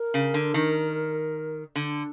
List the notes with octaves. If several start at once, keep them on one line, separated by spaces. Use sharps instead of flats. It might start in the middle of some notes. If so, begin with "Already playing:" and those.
Already playing: A#4
C#3
D3
D#3
D3